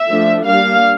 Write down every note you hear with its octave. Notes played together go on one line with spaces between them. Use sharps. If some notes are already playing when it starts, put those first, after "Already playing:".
Already playing: E5
F3 A3 D4
G3 A#3 D4 F5